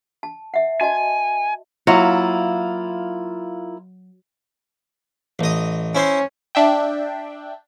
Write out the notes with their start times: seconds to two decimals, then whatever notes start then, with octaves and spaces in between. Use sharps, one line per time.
0.23 A5
0.54 E5 F#5
0.81 F#4 D#5 G#5 A5
1.87 F#3 A#3 E4 F4
5.39 A1 D#5
5.95 C#4 E4 C5 C6
6.55 D4 E5 G5